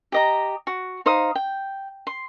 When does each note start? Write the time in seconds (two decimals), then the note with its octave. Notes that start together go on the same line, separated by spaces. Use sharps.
0.12 G4 D#5 A#5
0.67 F#4
1.06 D#4 C5 F5 D#6
1.35 G5
2.07 C6